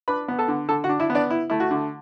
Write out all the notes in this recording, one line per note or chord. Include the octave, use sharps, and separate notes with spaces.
D4 B4 B5
B3
A4 A5
D3
D3 A4 A5
F#4 F#5
D4
E4 E5
B3
D4 D5
E4
A3 E4
F#4
D3